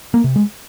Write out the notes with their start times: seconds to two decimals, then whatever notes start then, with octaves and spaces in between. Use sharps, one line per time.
0.14 A#3
0.24 C3
0.36 G#3